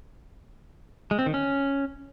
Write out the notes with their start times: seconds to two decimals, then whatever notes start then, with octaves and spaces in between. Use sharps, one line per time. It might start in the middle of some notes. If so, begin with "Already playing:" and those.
1.11 G#3
1.19 C4
1.26 D#3
1.34 C#4